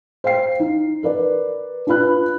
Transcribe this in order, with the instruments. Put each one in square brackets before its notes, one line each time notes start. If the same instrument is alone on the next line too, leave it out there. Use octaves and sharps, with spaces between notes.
[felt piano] C5 F5 G5 C7
D#4
A#4 B4 D5
D4 F4 B4 B5 F#6